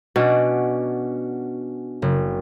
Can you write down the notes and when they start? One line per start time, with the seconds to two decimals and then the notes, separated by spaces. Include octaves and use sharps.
0.16 B2 C#4 D4 F#4
2.02 F#1